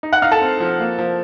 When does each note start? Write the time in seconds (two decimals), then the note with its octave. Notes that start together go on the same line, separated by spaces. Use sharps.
0.03 D#4
0.13 F#5 F#6
0.22 D#4 F5 F6
0.31 A4 A5
0.41 C4
0.60 F3
0.79 A#3
0.99 F3